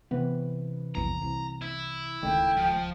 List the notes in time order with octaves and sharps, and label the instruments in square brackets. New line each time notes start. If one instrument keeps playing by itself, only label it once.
[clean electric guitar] C3 E3 B4 [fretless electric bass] B3
[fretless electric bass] A#1 E2 G2 [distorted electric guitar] A#5
[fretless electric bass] C2
[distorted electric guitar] E4
[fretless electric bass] D1 C#2 D#3 [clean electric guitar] A3 [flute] G5
[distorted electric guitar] F3